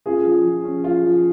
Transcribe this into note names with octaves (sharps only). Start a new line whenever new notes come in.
C#4 F4 G#4
F3
F3
C#4
F3 F4
F3